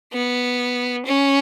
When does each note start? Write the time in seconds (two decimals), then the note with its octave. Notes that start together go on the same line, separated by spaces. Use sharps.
0.13 B3
1.06 C#4